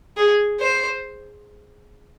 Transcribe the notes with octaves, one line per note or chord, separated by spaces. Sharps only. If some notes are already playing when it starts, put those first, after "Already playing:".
G#4
C5